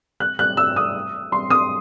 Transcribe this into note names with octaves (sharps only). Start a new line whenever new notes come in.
F#6
F#6
E6
D#6
C6
D#6